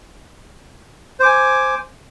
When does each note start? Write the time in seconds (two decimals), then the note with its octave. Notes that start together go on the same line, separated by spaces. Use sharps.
1.20 C5
1.23 D6
1.25 G#5